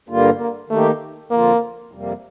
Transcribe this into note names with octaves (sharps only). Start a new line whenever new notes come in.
G2 D3 G3 A#3 F4
A#3
D#3 A3 A#3 D#4 G4
F2 D3 F3 A#3 C4 F4
F2 C3 G3 A#3